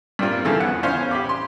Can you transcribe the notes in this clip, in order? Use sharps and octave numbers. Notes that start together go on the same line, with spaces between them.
G2 G3 A#3 C4 F4
C#3 E3 F3 A4
E2 B3 F#5
E3 C#4 C5 F5 C6
G4 B5 D6
C6